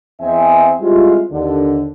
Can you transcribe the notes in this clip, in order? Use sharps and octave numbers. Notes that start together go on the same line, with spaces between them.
E2 C4 D#5 E5 G#5
G3 G#3 C4 E4 F4
D#2 D3